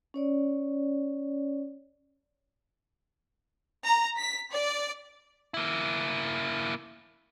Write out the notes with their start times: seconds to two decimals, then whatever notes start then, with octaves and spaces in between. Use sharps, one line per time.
0.14 C#4 C#5 D5
3.84 A#5
4.17 B6
4.51 D5
5.54 A#3 E4